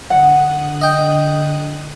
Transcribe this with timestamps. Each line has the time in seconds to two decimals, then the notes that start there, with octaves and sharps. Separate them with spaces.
0.10 D3 F#5 D#6 F#6
0.82 D#5 G5